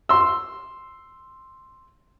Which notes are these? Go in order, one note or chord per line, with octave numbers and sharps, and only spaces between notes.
C6 E6